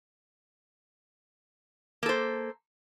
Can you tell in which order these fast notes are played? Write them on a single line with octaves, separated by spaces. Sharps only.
A#3 A4 C5